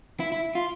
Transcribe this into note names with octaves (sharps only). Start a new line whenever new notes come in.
E4
E4
F4